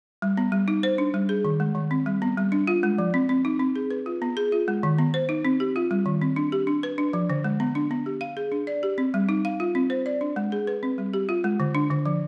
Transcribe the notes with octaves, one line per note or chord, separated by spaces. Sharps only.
G3
B3
G3
D#4
C5
D4
G3
G#4
D#3
G#3
D#3
C4
G3
B3
G3
D4
F4
G#3
F3
C4
C4
D#4
C4
G#4
B4
F4
B3
G#4
F4
G#3
D#3
B3
C5
D#4
C4
G4
F4
G3
D#3
C4
D4
G4
D4
B4
D4
F3
D3
G#3
B3
D4
B3
G4
F5
G#4
D4
D5
G4
C4
G3
D#4
F5
F4
C4
C5
D5
D4
G#3
G#4
B4
C4
G3
G4
F4
G#3
D3
D4
D3
F3